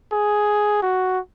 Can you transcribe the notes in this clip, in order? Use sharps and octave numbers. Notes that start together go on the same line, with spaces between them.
G#4
F#4